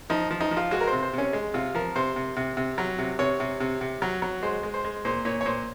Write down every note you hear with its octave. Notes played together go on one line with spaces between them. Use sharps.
F3 D#4
F3
D#4
F3
F4
G#3 F#4
A#4
C5
C3
C5
C3 C#4
G#3
C3 F4
F3 A#4
C3 C5
C3
C3
C3
F#3
C3
C3 C#5
C3
C3
C3
F#3
F#3
G#3 C5
G#3
C5
G#3
A#2 C5
A#2 C#5
C#5
A#2 C5